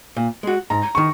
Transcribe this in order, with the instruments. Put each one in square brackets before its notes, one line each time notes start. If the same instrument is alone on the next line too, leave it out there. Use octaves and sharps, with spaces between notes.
[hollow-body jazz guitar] A#2
G#3 F#4
[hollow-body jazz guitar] G#2 [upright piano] A#5
[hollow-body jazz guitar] D#3 [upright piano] C#6